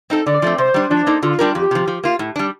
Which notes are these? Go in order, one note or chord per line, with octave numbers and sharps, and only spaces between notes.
C4 D#4 A4
D3 D5
F3 A3 C4
C3 C5
G3 D4
F3 D4
A#3 D#4 A4 C5
D3 F4
G3 D4 G4 A#4
F2 G4
C3 F3
F3
A#3 F4
A2
G3 D4